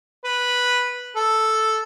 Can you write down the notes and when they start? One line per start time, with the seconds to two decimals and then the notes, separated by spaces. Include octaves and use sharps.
0.24 B4
1.16 A4